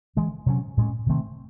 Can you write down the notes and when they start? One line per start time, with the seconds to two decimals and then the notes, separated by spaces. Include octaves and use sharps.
0.16 E3 G#3 C#4
0.46 C3 F#3 C#4
0.77 A2 G#3 C#4
1.06 C3 D#3 A3 C4